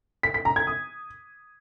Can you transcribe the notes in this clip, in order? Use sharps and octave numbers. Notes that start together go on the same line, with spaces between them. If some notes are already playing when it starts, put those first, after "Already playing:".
B6
B6
A#5
G#6
D#6